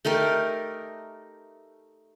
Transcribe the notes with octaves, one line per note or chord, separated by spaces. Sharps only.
A3 D#4 G4 A#4